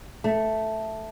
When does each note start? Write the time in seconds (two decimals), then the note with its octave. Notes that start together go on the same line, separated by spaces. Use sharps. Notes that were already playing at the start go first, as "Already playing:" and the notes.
0.24 A3